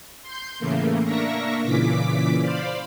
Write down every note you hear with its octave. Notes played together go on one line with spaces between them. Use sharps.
C6 G6
A2 C#3 E3 A3 A#3
A#3 D4 A#4 E5 C#6 A#6
A#2 C#3 E3 D6 B6
C5 D5 F5 B5